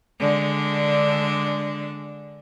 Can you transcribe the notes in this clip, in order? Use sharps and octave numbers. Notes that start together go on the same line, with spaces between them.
D3 G#3 D4